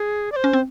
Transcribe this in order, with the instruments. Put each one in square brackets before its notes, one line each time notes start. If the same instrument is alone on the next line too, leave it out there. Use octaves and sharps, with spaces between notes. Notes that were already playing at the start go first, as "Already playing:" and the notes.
Already playing: [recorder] G#4
D5
C5
[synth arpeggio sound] C#4
C4